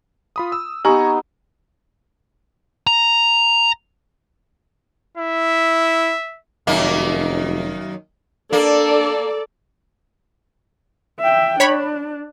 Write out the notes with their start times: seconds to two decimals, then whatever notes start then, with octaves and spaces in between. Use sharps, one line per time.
0.36 F4 B5 D#6
0.52 E6
0.85 B3 D#4 G4 G#5 A#5 C#6
2.87 A#5
5.18 E4 E5
6.67 F1 F#2 D#3 A#3
8.53 A#3 D4 A4 D5
11.20 E5 G5
11.60 D4 C#5 B5